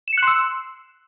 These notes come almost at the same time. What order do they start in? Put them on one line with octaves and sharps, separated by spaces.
E7 C#7 F#6 C6 E6